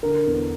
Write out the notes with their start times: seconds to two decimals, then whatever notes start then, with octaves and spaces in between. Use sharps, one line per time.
0.03 D3 A#4
0.27 E2